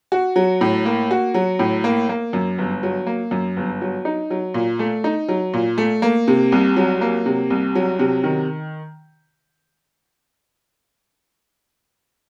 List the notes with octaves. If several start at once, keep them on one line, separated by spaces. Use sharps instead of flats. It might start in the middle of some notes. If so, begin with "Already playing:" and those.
F#4
F#3
A2
A#3
F#4
F#3
A2
A#3
A#3
F#2
G1
F#3
A#3
F#2
G1
F#3
D#4
F#3
A#2
A3
D#4
F#3
A#2
A3
A#3
C3
C2
F#3
A#3
C3
C2
F#3
C3
D#3